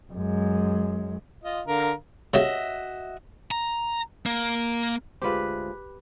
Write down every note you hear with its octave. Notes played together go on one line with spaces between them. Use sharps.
F#2 G#3
F4 D#5
D3 A#4 F5
C#3 F#4 G4 D#5 E5
A#5
A#3
D2 G#3 F4 G4 B4 C5 E5